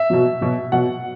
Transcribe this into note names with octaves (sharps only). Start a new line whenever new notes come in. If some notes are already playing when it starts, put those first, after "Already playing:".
Already playing: E5
B2 F#3
B2 F#3
B2 F#3 F#5